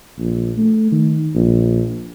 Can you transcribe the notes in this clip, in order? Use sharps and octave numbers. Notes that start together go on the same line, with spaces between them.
A#1
A3
D#3
A#1